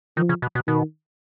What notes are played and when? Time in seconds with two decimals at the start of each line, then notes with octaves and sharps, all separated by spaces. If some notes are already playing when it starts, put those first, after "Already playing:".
0.17 D#3 F3
0.29 C#3
0.42 B2
0.55 B2
0.68 B2 D#3